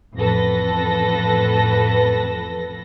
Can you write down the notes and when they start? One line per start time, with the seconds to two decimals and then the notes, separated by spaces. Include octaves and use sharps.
0.16 A1 F2 A4 B4 A#6